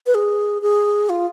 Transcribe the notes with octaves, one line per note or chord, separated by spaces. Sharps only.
B4
G#4
G#4
F4